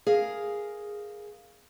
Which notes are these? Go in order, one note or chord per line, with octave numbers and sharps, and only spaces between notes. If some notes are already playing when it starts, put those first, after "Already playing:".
G#4 A#4 F5